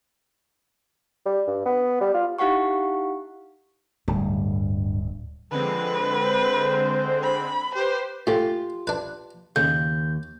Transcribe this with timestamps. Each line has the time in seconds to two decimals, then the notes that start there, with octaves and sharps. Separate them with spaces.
1.26 G3
1.47 G2
1.65 B3
2.01 G3
2.14 F4
2.39 D#4 E4 G4 F5 F#5 C#6
4.08 D1 G2
5.51 D3 F3 G#3 C4 B4
6.26 C5
7.23 B5
7.75 G4 B4 C5
8.27 A2 F4 G4
8.87 D4 B4
9.56 D#2 C#3 G6